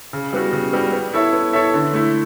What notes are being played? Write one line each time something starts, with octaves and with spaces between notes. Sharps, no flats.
C#3
G3 B3 F#4
C#3
G3 B3 F#4
B3
E4 A4 C#5 E5
B3
E4 A4 C#5 E5
D3
A3 E4